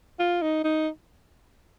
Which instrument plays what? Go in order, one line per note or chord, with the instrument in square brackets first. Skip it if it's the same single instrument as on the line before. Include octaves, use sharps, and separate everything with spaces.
[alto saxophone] F4
D#4
D#4